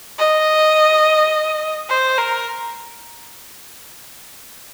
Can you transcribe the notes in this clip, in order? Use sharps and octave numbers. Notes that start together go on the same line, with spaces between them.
D#5
C5
A#4